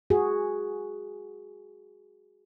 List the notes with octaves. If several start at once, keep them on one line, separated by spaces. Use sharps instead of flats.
F#4 G#4